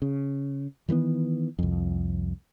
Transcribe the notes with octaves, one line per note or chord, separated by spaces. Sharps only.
C#3
D#3 E3 A3 B3
C2 F2